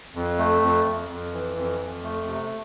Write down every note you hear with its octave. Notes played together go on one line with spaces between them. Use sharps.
F2
A3
F2
F2
F2
E3
F2
F2
A3
C3